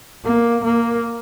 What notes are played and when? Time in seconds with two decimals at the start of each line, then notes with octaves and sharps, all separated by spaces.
0.24 A#3
0.64 A#3